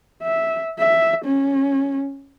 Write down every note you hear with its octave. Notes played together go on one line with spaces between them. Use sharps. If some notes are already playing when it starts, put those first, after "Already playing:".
E5
E5
C#4